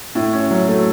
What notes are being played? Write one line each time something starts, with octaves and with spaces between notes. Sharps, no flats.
A2
C#4
F#3
A3